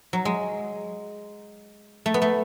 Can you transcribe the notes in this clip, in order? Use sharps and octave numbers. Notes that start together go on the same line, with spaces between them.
F#3
G#3
A3
B3
A3